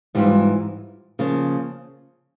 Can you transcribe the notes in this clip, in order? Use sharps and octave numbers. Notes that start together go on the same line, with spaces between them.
G#2 E3 G3 C4 F4
C#3 F3 A#3